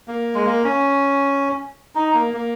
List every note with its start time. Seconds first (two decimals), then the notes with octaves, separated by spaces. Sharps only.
0.08 A#3
0.35 G#3
0.46 A#3
0.64 C#4
1.95 D#4
2.14 A#3
2.34 A#3